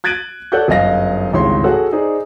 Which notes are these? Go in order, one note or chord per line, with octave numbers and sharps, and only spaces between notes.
F#6 G#6 A6 D7 D#7 F#7
A4 C#5 D5 F#5 F#6 G6
G1 F#2 D#5 F5 A#6
G#1 C#2 G2 E3 C#5 C6
F#4 G#4 A4 C#5 F#5
D#4 G#4 C5 D5